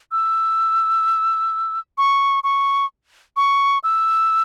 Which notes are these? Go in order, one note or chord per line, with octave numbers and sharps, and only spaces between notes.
E6
C#6
C#6
C#6
E6